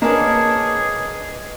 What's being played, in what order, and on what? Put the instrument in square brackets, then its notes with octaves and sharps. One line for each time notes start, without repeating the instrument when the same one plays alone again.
[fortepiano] A#3 [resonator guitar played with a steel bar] C#4 D4 [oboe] G#4 [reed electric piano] B4 D#5